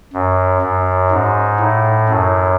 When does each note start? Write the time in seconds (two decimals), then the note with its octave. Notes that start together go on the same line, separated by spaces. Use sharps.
0.13 F#2
0.62 F#2
1.11 G#2
1.60 A2
2.09 F#2